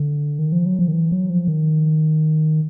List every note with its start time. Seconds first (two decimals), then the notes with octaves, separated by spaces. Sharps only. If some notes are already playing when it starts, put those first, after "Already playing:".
Already playing: D3
0.39 D#3
0.52 F3
0.66 F#3
0.79 F3
0.88 D#3
0.93 E3
1.11 F#3
1.30 F3
1.47 D#3